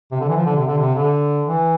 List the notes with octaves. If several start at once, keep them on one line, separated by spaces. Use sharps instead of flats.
C3
D3
E3
F3
D3
C3
D3
C3
D3
E3